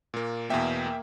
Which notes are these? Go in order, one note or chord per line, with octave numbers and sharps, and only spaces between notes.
A#2 A#3
E2 B2 A#3 E5 G5
A#3